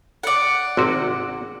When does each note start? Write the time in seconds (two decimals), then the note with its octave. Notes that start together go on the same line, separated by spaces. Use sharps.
0.23 D5 F#5
0.77 G#1 C3 F#4